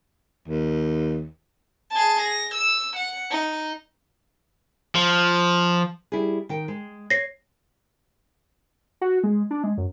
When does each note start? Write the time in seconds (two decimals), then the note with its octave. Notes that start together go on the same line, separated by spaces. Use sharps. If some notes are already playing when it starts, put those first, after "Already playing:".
0.48 D#2
1.91 G#4 A5
2.21 A#6
2.54 E6
2.96 F#5
3.30 D#4
4.95 F3
6.12 G3 E4 G#4
6.49 D#3 G5
6.68 G#3
7.10 C#5 A#6 C7
9.01 F#4
9.24 G#3
9.51 D4
9.64 G#3
9.78 F#2